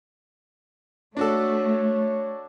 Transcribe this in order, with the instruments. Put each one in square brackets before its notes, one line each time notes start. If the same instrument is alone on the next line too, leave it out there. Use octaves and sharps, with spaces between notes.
[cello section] A3 [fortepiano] D4 F#4 A4 [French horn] C#5